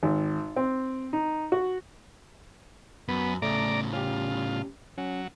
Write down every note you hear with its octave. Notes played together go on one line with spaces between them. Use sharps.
G#1
C4
D#4
F#4
F#2 B3
A2 C#3 A3 D5 A#5
C#4 F4 G4
F#3 C#4